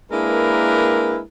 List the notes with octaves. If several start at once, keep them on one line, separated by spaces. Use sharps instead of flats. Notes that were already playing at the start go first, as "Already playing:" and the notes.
G#3 A#3 D4 E4 A#4 B4